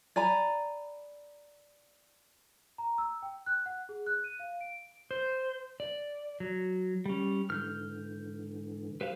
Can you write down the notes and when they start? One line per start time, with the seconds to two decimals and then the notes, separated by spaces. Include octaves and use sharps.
0.16 D5 G#5 A#5 B5
2.78 A#5
2.98 E6
3.22 G5
3.46 F#6
3.66 F#5
3.89 G#4
4.07 F#6
4.24 D#7
4.39 F5
4.61 D7
5.11 C5
5.80 D5
6.40 F#3
7.06 G3 C#4
7.50 G#2 D3 E3 F6 G6
9.01 F#3 G4 B4 C5 F5